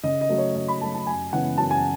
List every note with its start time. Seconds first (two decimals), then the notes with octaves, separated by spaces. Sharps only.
0.04 C#3 D#5
0.21 D#5
0.29 F#3 A3
0.38 C#5
0.55 C#3 D#5
0.68 B5
0.81 F#3 A3 A5
0.94 A5
1.07 F#2 G#5
1.33 C#3 E3 G#3 B3 F#5
1.57 F#2 A5
1.71 G#5